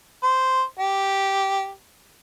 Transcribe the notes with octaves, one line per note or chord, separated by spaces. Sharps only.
C5
G4